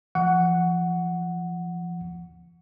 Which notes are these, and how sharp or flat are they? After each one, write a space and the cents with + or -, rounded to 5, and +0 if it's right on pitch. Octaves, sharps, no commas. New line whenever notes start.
F3 -25 F#5 +0 C#6 +25